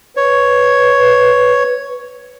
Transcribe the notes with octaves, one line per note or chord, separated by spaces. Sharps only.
B4 C#5